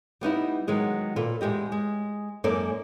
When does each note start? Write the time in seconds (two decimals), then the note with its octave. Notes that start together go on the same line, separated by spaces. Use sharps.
0.21 G3 B3 D#4 E4
0.67 D#3 F#3 G#3 B3
1.16 A#2 F4 A4 B4
1.41 E2 G#3 G4 D#5
1.72 G#3
2.44 F#2 G#3 A#3 D#4 A4 D5